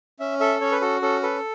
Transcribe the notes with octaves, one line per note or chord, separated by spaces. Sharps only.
C#4 E5
A4 E5
C#4 C#5
B4
F#4 A4
C#4 A4
A4 B4